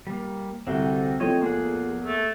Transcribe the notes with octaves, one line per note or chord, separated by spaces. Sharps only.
G3 A#3
C2 D3 C4 F#4 G5
F3 A3 C4 C#5 D#5
E2 A#3 G#4 F#5
A3